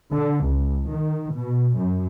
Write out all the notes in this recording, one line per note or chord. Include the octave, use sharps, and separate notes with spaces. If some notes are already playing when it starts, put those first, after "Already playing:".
D3
C#2
D#3
B2
F#2